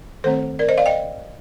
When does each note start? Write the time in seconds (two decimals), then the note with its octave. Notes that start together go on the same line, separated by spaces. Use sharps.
0.24 D#3 A3 C4 A4 C5
0.59 A#4 D5
0.69 C5 D#5
0.78 D5 F5
0.86 D#5 G5